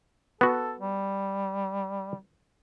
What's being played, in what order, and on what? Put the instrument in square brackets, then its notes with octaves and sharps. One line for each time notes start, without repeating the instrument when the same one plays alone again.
[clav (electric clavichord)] B3 F#4 [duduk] A4
[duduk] G3